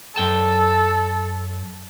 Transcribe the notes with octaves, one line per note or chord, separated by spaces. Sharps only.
F#2 A4 G5 A5